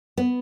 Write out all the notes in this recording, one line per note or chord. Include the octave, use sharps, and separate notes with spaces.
B3